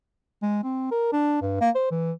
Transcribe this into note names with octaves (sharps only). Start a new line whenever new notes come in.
G#3
C4
A#4
D4
G2
A#3
C5
E3